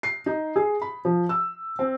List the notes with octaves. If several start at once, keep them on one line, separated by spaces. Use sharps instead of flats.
C7
D#4
G#4
B5
F3
E6
C4